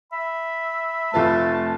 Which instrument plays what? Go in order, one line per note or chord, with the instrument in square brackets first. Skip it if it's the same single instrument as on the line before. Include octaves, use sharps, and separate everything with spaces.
[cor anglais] E5 [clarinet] B5
[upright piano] F1 F4 B4 [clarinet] A3 [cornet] A5